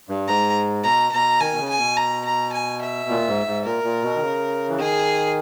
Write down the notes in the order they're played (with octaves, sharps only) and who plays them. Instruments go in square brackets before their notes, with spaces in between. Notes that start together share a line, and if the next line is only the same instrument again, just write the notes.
[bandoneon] G2
[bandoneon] G#2 [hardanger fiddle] A#5
[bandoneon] B2 [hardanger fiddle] A#5
[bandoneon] B2 [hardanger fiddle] A#5
[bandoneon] D#3 [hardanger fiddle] G#5
[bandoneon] B2
C#3
[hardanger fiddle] G#5
[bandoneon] B2
[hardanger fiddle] A#5
A#5
G#5
E5
[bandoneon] A#2
G#2
G#2
[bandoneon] A#2 [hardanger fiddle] A#4
[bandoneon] A#2
B2
D#3
C#3
E3
[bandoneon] D#3 [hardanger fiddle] G#4